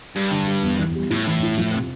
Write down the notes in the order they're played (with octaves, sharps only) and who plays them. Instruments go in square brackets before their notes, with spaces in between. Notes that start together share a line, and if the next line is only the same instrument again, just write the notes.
[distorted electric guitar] G2 [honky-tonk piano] G3
[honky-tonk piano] D3
G3
E2
E3
G3
[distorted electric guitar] A2 [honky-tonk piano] E4
[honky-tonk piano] E3
E4
F3
C3